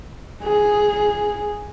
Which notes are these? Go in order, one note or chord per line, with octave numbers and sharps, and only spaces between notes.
G#4